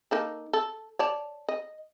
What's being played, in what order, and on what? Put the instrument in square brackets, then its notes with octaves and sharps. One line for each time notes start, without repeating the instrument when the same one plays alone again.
[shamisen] A#3 D#4 A4
A4
C#5 D5 A5
D#5